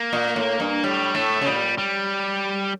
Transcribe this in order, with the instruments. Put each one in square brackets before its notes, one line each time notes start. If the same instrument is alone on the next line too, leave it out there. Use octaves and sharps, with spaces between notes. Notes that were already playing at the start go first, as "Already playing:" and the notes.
Already playing: [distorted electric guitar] A#3
[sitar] A#2
A2
G2
[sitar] A2 [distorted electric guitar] G3
[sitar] A2 [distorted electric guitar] A3
[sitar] C#3
[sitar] A#2 [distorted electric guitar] G3
[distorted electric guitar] G3